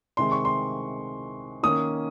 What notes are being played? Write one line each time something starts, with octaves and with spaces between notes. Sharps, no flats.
C3 D#3 G#3 C4 C6
C#6
C6
D#3 A#3 C#4 D#6